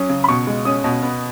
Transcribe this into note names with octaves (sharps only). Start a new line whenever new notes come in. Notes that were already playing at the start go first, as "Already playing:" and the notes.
Already playing: F#3 C#4 D#6
C#3
B5
B2 C#6
G#3
C#4 D#6
B2
B3